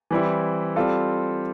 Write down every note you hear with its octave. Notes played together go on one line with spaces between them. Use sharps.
E3 G3 C4 E4
G3 C4 F4 A4